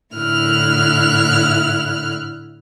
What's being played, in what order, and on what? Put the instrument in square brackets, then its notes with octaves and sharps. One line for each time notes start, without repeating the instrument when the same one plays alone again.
[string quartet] A2 D3 E4 F6 F#6